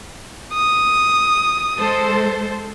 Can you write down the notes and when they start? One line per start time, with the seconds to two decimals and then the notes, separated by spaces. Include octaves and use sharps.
0.54 D#6
1.77 G#3 A4 C5